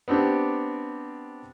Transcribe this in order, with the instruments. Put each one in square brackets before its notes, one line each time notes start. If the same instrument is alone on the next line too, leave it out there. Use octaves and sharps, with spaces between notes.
[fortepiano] B3 C4 D4 G4